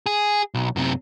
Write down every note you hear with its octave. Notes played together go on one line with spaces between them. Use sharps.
G#4
B1
F#2 C3